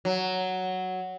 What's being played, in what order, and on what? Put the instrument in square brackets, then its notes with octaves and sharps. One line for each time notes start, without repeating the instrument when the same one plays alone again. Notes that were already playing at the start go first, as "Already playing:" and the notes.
[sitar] F#3